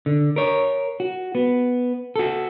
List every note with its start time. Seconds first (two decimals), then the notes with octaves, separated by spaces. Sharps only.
0.06 D3
0.36 A#4 C#5
1.00 F#4
1.35 B3
2.16 F#4 A4